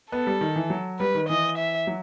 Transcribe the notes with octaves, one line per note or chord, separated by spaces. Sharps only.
B3 A4
G3
D#3
E3
F#3
G3 B4
D#3
E3 D#5
E5
F#3